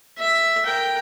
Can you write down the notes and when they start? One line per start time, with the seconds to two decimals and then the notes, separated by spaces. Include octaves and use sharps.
0.19 E5
0.66 A#4 G5